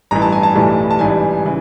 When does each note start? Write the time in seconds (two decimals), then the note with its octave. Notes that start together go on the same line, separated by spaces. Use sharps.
0.11 A1 G2 E3 A#5
0.22 A5
0.32 G#5
0.43 A5
0.55 B1 A2 E3 G3
0.90 A5
0.99 A1 G#2 E3 G3 G#5
1.45 C#3 E3